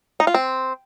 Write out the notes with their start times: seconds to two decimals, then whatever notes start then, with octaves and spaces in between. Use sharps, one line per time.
0.20 D#4
0.27 F4
0.34 C4